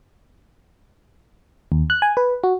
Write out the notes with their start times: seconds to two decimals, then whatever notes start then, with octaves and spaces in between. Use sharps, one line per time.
1.72 D#2
1.90 F#6
2.02 G#5
2.17 B4
2.44 F#4